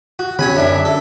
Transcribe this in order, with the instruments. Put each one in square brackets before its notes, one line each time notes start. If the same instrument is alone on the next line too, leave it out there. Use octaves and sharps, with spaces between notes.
[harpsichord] F#4
[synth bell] D3 [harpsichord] C#4 G#5 B5
[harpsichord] F#2 D4 [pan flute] E5
[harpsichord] A4